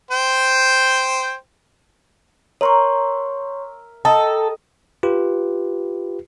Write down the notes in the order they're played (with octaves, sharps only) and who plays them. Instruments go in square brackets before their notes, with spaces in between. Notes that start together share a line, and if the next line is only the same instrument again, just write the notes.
[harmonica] C5 G5
[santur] A#4 E5 [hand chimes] C#5 C6 C#6
[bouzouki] A4 [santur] D#5 [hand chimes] G5 A#5
[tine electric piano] F4 G4 B4